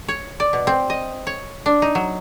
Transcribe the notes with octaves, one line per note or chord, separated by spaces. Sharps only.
C#5
D5
B2
C4
D#5
C#5
D4
D#4
F#3